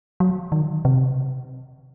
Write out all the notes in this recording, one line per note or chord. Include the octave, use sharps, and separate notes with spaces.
F#3
D#3
C3